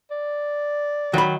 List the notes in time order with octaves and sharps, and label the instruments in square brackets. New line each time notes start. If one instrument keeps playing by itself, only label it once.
[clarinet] D5
[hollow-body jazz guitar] D#3 B5 [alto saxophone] F#3